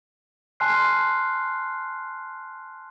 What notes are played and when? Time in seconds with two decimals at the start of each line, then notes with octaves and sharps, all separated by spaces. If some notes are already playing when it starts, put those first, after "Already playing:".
0.60 G#5 A5 C6 F6 F#6 C7